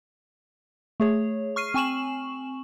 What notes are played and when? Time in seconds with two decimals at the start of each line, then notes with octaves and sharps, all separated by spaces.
1.00 A3 G#4 C#5
1.56 C#6 F6 C7 D#7
1.74 C4 G#5 C#6 E7 F#7